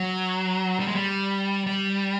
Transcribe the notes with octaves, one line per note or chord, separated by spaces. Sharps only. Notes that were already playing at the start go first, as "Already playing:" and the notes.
Already playing: F#3
G3
G#3
G3
G3